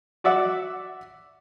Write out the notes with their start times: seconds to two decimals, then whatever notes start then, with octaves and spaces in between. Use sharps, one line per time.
0.24 F#4 D5 E5 F#5